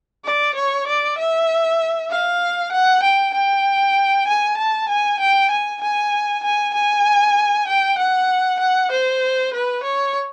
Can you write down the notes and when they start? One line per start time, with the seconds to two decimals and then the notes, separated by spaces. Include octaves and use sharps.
0.25 D5
0.55 C#5
0.87 D5
1.19 E5
2.11 F5
2.72 F#5
3.03 G5
3.34 G5
4.27 G#5
4.58 A5
4.89 G#5
5.20 G5
5.51 G#5
5.82 G#5
6.44 G#5
6.74 G#5
7.68 G5
7.99 F#5
8.60 F#5
8.92 C5
9.54 B4
9.83 C#5